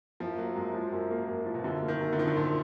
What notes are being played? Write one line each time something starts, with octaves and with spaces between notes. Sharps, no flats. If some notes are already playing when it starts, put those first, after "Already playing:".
F#2 F3
F#3 A#3
F#2 G#3
F3 F#3
F#2
A#3
F#2
F3
B2
F#2 D3
A#3
D#3
F#2
D3
D#3 F3
D3
F#2 A#2